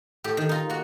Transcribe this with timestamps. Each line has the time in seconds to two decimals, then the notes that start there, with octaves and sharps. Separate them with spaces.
0.24 A2 G4
0.37 D#3
0.49 D#4 F4 A#5
0.70 A#3 F#4